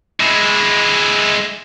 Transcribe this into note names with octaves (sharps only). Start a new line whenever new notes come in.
G#3 E4